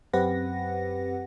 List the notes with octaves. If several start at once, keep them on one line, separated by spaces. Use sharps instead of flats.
F#2 C4 G4 B4 F#5 A#6